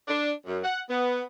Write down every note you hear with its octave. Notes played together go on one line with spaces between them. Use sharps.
D4
F#2
F#5
B3